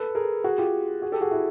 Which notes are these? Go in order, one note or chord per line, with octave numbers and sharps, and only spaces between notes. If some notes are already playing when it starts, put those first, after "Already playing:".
Already playing: A4 B4
G#4 A#4
F#4 G#4
F4 G4
F#4 G#4
G4 A4
F#4 G#4
E4 F#4